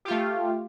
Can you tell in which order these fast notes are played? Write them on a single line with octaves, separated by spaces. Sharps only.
G4 F4 A3